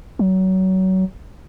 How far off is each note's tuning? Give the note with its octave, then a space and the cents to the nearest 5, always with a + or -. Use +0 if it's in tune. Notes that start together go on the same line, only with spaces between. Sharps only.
F#3 +25